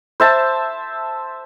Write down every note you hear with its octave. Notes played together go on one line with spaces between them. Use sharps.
C5 E5 A5